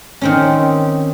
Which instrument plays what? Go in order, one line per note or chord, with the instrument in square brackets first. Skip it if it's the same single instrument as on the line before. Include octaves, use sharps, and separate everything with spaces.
[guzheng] D#3 C4 C#4